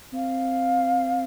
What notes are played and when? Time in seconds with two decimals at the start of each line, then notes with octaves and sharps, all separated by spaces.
0.13 C4 F5